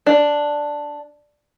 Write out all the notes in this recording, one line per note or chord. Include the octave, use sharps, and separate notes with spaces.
D4